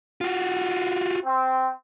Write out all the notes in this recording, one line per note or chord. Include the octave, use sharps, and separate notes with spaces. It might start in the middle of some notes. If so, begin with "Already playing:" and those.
F4 F#4
C4